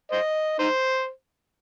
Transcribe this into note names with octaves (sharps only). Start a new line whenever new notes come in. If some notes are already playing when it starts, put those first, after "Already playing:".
C5 D#5
D#4 C5